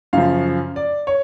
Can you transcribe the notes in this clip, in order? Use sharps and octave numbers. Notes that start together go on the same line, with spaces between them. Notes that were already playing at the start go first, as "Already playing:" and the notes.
F#2 C#3 F3 F5
D5
C#5